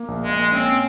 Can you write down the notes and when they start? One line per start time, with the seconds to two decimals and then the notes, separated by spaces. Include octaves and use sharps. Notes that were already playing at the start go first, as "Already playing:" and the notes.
Already playing: A#3
0.08 A#1
0.23 G#3
0.30 A#3
0.52 C4 C#4